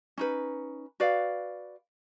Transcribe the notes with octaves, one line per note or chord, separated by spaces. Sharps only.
C#4 D#4 B4
F#4 B4 D5 F5